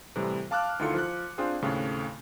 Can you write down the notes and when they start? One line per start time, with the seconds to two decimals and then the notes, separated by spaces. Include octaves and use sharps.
0.15 A2 C3 E3 G3
0.51 F5 A5 D6 F6 F#6
0.79 D2 D#3 E4 F4 A4 C#7
0.94 F3 F#6
1.38 C4 D4 F4 G#4 G5
1.62 D#2 A2 C#3 A3 C4